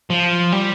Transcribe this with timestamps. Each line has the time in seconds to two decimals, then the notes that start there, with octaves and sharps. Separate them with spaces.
0.10 F3
0.52 G3